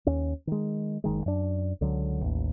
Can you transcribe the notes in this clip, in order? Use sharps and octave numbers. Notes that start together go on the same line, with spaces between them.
D#2 C#4
D#3 G#3
F#1 D#3 G#3
F#2 D4
C#2 D3 F#3
A1 D#2